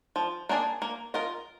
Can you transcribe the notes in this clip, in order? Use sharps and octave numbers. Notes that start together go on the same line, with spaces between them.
F3
A#3 D4 G#4 D5
A#3
F4 A#4 D#5